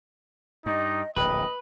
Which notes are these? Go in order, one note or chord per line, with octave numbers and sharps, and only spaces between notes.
G2 D#4 D#5
D1 A#1 B4 D#5 G5